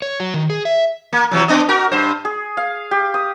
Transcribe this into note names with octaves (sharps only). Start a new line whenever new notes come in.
C#5
F#3
D#3
G#4
E5
A#3
C3 E3 F#3
B3 D4 D#5
F#4 A#4
G2 C5
G#4
F5
G4
D#6